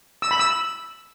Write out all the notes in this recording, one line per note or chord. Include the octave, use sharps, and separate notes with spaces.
E6
B5
E6